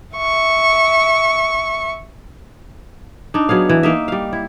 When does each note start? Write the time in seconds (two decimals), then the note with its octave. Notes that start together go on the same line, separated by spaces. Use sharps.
0.17 E5 C#6
3.34 D4 D#4
3.49 F#3 B3 G#4 F5
3.69 E3
3.83 A#3 D#4 E5
4.08 G3 F5
4.33 E4